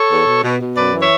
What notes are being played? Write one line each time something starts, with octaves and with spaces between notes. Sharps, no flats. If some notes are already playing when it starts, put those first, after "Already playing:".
Already playing: A4 C#5
E2
B2
B2
B2
F#2 B4 D5
E3
C#5 E5